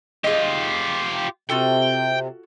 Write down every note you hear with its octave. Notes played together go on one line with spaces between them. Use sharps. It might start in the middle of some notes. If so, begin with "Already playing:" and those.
F4 G4 G#4 D#5
C3 F4 F#4 A4 G5